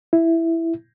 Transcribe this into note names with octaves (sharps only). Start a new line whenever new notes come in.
E4